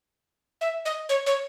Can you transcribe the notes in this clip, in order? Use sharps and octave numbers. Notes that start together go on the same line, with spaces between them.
E5
D#5
C#5
C#5